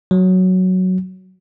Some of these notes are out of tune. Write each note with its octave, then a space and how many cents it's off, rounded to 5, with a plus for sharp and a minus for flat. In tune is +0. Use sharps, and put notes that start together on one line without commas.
F#3 +0